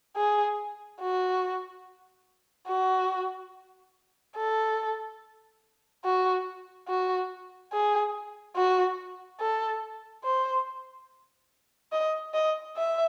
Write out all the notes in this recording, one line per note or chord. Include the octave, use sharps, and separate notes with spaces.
G#4
F#4
F#4
A4
F#4
F#4
G#4
F#4
A4
C5
D#5
D#5
E5